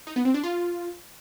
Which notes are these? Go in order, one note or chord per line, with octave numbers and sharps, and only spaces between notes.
D#4
B3
C4
D4
F4